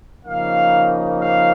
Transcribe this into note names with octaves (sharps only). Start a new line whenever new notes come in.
C#3 F3 A#3 D#4 F5
F5